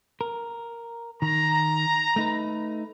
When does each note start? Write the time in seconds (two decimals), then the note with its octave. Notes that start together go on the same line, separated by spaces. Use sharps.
0.21 A#4
1.22 D#3 A#5
2.16 A3 D#4 B4